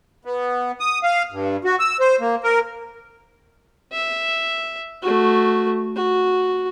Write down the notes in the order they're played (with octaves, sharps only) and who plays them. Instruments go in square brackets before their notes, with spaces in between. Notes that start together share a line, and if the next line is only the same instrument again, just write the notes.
[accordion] B3
D#6
F5
G2
F#4
E6
C5
A#3
A#4
[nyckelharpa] E5
A3 F#4
F#4